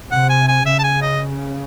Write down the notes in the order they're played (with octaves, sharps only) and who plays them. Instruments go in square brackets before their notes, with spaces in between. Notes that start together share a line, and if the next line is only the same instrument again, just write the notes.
[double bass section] C3 [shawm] F#5
[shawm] G#5
G#5
[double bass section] C#3 [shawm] E5
[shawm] A5
G#5
D#5